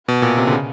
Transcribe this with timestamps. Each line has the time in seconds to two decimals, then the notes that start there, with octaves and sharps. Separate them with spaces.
0.08 B2
0.22 A#2
0.38 C3
0.47 D3
0.52 C#3